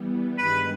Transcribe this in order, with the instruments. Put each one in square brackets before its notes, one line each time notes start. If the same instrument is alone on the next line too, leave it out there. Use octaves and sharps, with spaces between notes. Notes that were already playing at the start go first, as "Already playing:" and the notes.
Already playing: [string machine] E3 G3 B3
[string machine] G2 D#3 G#3 [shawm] B4